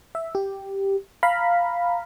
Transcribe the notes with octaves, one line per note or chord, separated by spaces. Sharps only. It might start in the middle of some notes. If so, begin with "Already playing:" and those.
E5
G4
F5 A#5 B5